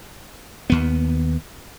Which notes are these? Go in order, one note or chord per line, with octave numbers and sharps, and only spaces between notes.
D#2 B3